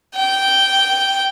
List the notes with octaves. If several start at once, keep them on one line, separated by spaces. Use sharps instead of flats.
G5